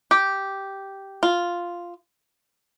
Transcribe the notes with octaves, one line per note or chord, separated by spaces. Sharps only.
G4
F4